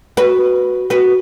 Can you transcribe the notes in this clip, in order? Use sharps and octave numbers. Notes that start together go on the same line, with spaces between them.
F#4 B4
F#4 B4